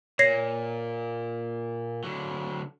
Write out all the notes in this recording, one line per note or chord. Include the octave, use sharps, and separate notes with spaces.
A#2 C#5 A#6 C7
D3 F#3